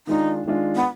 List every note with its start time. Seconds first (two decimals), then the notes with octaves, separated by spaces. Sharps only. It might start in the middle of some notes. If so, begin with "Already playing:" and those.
0.07 D#3 G#3 D4 D#4 F4
0.46 D#3 G#3 D4 F4
0.75 B3